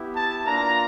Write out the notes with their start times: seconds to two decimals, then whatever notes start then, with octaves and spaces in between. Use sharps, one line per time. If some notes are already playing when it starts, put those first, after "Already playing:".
Already playing: B3 E4 G4
0.15 A5
0.46 A#3 D4 F4 A#5